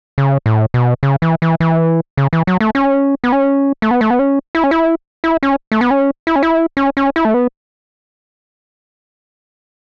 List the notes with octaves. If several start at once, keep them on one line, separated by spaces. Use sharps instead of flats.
C#3
A2
B2
C#3
E3
E3
E3
C#3
E3
F#3
A3
C#4
B3
C#4
A3
B3
A3
B3
C#4
E4
C#4
E4
E4
C#4
A3
B3
C#4
E4
C#4
E4
C#4
C#4
E4
A3
B3